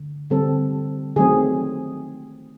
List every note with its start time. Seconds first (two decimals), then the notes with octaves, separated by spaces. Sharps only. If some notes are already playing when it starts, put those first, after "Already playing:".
Already playing: D3
0.30 D3 G3 C4 A4
1.16 D#3 F#3 A3 C4 G#4